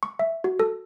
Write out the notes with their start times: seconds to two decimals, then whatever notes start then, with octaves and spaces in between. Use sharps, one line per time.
0.03 C#6
0.19 E5
0.44 F#4
0.60 A4